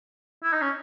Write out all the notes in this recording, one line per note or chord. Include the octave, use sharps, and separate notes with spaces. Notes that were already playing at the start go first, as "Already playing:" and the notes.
E4
D#4
C#4